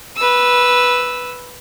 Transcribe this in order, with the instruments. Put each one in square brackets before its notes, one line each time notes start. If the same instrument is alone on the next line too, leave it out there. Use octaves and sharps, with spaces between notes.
[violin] B4 E6